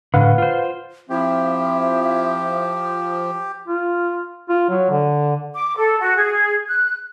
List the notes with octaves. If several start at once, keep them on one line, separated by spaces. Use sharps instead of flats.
A2 D3 B4 F5 F#5
F4 C5
F3 C4 E4 G4 E5
F4
F4
F#3
D3
D6
A4
F#4
G#4
F#6